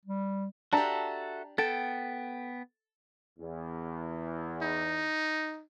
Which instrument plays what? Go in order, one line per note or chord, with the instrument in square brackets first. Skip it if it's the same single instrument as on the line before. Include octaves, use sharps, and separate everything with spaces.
[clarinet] G3
[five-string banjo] D4 G4 [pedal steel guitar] F#4 A4 E5 [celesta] A5 A#5
[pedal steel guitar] B3 G5 [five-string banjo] A4 [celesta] A6
[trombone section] E2
[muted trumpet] D#4